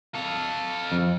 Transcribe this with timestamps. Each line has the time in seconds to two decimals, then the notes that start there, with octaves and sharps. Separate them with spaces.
0.14 A4 F5
0.92 F2